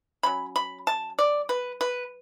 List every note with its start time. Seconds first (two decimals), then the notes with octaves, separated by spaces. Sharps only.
0.23 F#3 C#4 B5
0.56 B5
0.87 A5
1.19 D5
1.49 B4
1.81 B4